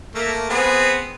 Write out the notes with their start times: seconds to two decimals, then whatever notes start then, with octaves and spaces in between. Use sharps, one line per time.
0.15 A3 A#3
0.50 B3 C4 G#4